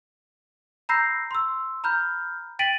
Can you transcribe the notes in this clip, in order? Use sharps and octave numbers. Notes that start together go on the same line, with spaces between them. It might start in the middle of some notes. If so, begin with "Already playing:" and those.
A#5 B5 E6 G6 A#6 C7
C6 E6
A#5 B5 F6 G6
G5 A6 B6 D7 D#7 F#7